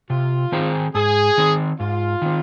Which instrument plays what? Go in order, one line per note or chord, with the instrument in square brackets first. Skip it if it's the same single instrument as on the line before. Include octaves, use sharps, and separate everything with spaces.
[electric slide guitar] C3 [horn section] F4
[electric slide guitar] D#3 C4 G#4 C5
[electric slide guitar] G#2 [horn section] G#4
[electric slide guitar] D#3 C4
[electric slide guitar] G#2 [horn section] F4
[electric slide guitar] D#3 C4